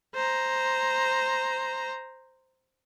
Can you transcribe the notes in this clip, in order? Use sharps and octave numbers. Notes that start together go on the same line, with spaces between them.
C5 A#5